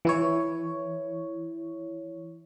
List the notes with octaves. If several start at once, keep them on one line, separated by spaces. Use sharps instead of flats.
E3 E4 C#5